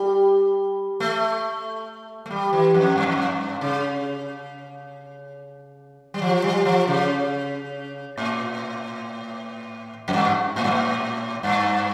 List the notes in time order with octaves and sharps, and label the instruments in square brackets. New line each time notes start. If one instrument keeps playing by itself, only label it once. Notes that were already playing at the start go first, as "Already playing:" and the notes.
Already playing: [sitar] G3
A3
A3
G3
E3
F2
G2
F2
G2
C#3
G3
F3
G3
F3
C#3
A2
F2
G2
A2
G2
A2
G2